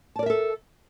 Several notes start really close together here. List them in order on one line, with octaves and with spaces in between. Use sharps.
A5 D5 A#4 E5 A4